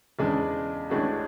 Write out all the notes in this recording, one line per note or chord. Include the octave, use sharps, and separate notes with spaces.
E2 C#3 G#3 D4
A1 A2 G#3 D4 F#4